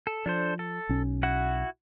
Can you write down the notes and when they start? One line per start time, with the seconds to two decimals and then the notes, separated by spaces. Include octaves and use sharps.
0.07 A4
0.26 F3 D4 A4 C5
0.59 A4
0.89 B1 C#4
1.23 E4 F#4 F#5